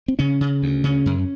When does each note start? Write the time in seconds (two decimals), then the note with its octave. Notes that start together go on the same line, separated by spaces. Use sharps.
0.08 C4
0.19 C#3 C#4
0.41 C#3
0.63 D2
0.84 C#3 C#4
1.06 F#2